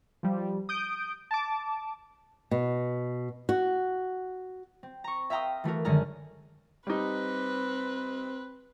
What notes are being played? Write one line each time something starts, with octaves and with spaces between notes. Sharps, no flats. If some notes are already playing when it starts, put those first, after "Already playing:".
F3 G3
D#6 G6 D7
A5 D6
B2
F#4
C4
A#5 C#6
E5 F5 G5 A#5 C6 D#6
E3 A3 F#4 A#4
F#2 D3 D#3 G#3 A#5 F6
G3 C4 D#4 B4